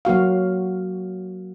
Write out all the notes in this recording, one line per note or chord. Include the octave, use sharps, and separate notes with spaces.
F#3 A#3 F#4 F5